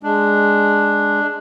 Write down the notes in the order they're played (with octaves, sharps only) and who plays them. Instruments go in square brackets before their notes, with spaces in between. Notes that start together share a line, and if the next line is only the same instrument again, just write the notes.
[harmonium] G#3 [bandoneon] D4